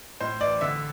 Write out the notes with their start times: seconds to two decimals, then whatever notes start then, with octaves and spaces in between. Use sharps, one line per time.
0.21 A2 C5
0.41 A1 D5
0.61 D3 E5